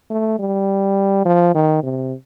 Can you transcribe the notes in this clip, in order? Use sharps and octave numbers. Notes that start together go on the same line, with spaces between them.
A3
G3
F3
D#3
C3